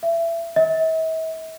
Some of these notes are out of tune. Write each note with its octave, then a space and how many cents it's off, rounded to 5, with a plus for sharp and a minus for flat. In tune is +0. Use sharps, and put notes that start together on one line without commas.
E5 +25
E5 -45